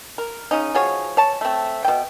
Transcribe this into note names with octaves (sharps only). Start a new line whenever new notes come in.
A#4
C#3 C#4 D#4
F3 F#4 G#4 C#5
C#5 A5
A3 C4
B2 G5